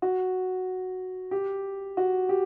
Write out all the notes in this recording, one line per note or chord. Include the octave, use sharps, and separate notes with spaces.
F#4
G4
F#4
G4